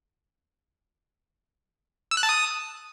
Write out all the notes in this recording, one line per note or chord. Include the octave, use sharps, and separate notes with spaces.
E6
F#6
A5
D#6